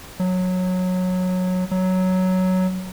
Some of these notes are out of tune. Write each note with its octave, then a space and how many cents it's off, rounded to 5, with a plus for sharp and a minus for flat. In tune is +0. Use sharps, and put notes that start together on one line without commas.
F#3 -15
F#3 +5